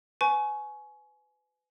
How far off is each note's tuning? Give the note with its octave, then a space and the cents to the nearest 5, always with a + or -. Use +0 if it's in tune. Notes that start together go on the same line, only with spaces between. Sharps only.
B4 +30 G#5 +20 C#6 +0